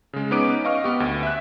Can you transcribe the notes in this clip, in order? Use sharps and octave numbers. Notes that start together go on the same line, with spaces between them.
C#3 G#3
B3 C#4 D#4 B4 D6 D7
D#5 F5 C#6 F6
B3 G4
D2
E5 F#6